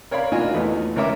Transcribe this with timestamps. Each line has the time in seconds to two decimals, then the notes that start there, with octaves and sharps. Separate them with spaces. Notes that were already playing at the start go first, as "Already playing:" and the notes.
0.11 A#4 C#5 D5 F5 B5
0.32 A#3 D4 D#4 F4 F#4 G#5
0.54 E2 A3 B3 D#4
0.96 C#2 C#4 A#4 C#5 E5 D6